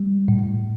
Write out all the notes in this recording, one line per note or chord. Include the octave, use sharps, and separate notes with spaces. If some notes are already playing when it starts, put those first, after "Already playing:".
Already playing: G3
A2